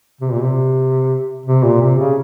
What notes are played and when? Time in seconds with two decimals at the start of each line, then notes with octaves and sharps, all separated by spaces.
0.21 C3
0.32 A#2
0.42 C3
1.46 C3
1.64 A#2
1.81 C3
1.99 C#3